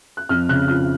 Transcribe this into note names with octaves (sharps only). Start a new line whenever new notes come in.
F#6
F2 F6
C#3 F#6
F3 F6